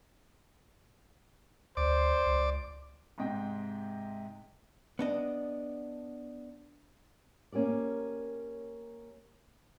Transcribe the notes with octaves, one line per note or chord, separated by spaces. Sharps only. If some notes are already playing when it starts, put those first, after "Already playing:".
D2 C5 D5 D6
C#2
G#2 C3 D#5 G5
B3 D4 D#5
A#3 C#4 G4 A#4 D5